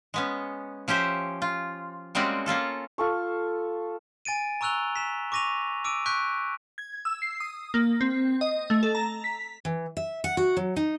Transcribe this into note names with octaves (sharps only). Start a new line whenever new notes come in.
G#3 B3 C#4
F3 C#4 G4 C5 E5
F4
G3 G#3 A#3 C4 C#4 F#4
A#3 C#4 F4 A4
F4 A4 C#6
G#5 A6 D7 D#7
A#5 C#6 E6 F#6 F7 G7
B6 E7
C#6 D6 A#6 D#7 F7
D6 E6 D7 D#7
C#6 F#6 G6 B6 D7
G#6
E6
C7
D#6
A#3
C4
D#5
A3
A4
A#5
B6
E3
E5
F#5
F#4
F#3
D#4